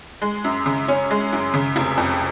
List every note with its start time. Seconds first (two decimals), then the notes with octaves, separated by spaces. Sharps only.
0.22 G#3
0.44 F#2
0.66 C#3
0.88 C#4
1.11 G#3
1.33 F#2
1.54 C#3
1.76 F1
1.97 F2